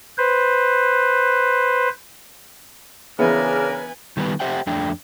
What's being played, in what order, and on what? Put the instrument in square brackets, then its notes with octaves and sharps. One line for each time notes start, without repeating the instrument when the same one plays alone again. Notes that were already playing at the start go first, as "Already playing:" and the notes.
[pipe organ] B4 C5
[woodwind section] C#3 D4 A#4 [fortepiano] E3 B3 [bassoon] G#4 [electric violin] B4 G#5
[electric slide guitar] D#3 G3 B3 B4
G4 C5 E5 F#5 G5
F2 A3 D4 G5